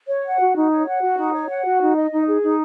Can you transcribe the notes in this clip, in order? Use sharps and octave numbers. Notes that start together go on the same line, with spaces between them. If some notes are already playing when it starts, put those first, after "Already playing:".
C#5
F#5
F#4
D#4
C#5
F#5
F#4
D#4
C#5
F#5
F#4
D#4
D#5
D#4
G#4
D#4